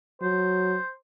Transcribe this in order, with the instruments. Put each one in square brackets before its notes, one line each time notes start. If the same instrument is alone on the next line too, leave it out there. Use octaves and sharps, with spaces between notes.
[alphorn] F#3 [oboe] C5